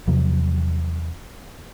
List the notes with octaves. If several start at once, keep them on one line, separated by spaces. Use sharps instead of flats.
E2 C3 F3 F#3